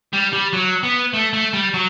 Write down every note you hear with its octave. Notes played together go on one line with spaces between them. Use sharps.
G3
G3
F#3
B3
A3
A3
G3
F#3